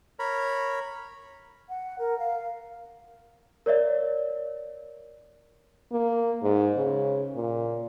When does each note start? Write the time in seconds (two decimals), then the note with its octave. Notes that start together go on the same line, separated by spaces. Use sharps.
0.19 A#4 C#5 B5
1.69 F#5
1.98 A#4
2.18 F5
3.66 A#4 C#5 D5 E5
5.92 A#3
6.43 G#2
6.76 C#3
7.36 A#2